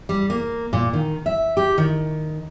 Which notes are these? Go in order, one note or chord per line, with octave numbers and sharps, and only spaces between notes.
G3
A#3
A#2
D#3
E5
G4
D#3